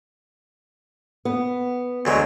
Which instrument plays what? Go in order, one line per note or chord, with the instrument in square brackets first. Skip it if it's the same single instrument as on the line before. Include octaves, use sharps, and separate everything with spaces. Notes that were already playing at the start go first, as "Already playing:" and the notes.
[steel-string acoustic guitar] B3
[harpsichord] D2 F#3 G#3